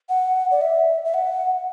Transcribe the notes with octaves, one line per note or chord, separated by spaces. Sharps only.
F#5
D5
E5
E5
F#5